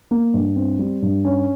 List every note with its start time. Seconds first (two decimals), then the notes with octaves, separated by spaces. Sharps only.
0.11 A#3
0.34 G2
0.56 C4
0.79 G3
1.02 G2
1.25 C#4